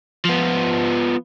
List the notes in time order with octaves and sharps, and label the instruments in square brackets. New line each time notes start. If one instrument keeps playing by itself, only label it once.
[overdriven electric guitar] F3 B3